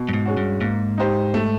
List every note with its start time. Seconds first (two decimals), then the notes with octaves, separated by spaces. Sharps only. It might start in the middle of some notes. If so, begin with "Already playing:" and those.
Already playing: B2
0.09 G2
0.14 G#2
0.25 G#3 C#4 F#4
0.37 G2
0.61 G#2 A#3
0.98 D#4 G4 C5
1.34 A3